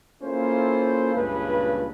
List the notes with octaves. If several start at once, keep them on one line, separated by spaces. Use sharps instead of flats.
A#3 C#4 E4 F4 A4 C5
C#2 G2 A#2 C#3 B4